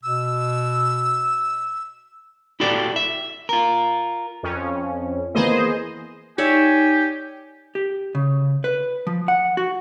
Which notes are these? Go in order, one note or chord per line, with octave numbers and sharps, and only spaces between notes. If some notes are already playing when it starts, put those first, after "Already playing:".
B2 E6
E4 F#4 G4 A4 D5
E5
F4 A#4
F2 C#4
E3 A#3 B3 G#4 C5 D#5
D#4 G4 C#5 D5 E5 G#5
G4
C#3
B4
F3
F#5
F#4